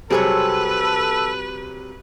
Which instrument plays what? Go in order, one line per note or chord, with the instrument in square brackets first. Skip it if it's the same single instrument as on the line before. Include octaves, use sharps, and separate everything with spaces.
[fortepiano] C3 F#3 G3 [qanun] C4 G#4 C#5 [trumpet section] A4 [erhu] B4